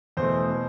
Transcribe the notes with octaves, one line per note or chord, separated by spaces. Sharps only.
E2 B2 A3 C5
B2 B3